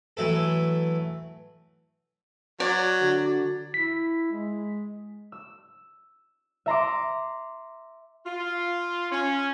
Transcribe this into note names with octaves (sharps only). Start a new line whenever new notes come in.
E3 F#3 A3 A4
F#3 D5
D3 F#4
E4 B6
G#3
E6
E5 A#5 C6 D6
F4
C#4